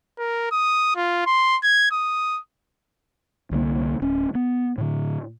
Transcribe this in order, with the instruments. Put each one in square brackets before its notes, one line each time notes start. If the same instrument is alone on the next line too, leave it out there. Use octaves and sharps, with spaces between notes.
[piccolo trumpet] A#4
D#6
F4
C6
G#6
D#6
[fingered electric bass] C2 D3 A3 A#3
D1 C#4
B3
A2 D3